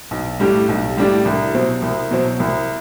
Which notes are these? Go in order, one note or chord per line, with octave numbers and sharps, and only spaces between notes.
B1
A2 G3 D4 G4
B1
A2 G3 D4 G4
C2
B2 F#3 C4
C2
B2 F#3 C4
C2